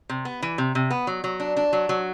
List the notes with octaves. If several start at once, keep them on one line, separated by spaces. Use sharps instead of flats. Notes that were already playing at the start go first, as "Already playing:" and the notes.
C3
B3
E3
C3
C3
B3
F#3
F#3
D4
D4
F#3
F#3